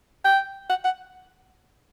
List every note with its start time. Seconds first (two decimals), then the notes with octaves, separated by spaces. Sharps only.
0.25 G5
0.69 F#5
0.85 F#5